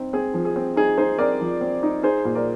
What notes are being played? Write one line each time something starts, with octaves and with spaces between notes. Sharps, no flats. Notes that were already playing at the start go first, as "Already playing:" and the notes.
Already playing: C4 D#4
C4 G#4
F3
G#4
C4
D#4 G#4
D#4 G#4 C5
C4 A#4 D5
F3
C4
D#4
D#4 G#4 C5
A#2
A#4 D5